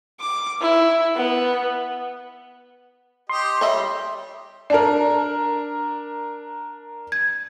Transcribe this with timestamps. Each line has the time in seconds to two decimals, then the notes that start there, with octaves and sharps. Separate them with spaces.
0.20 D6
0.61 E4
1.16 B3
3.29 G4 D#5 C6
3.61 G3 C#5 D#5 E5
4.70 D4 A#4 D5 A5
7.12 G#6